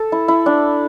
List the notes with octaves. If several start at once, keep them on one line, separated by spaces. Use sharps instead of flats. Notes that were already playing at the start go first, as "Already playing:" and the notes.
Already playing: A4
E4
E4
D4